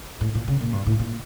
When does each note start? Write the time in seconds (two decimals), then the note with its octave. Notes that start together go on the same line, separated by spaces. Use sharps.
0.21 A2
0.35 A#2
0.48 C#3
0.61 A#2
0.73 G2
0.86 A2
0.99 A#2